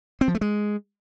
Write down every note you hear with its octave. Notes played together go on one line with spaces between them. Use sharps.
C4
F3
A3
G#3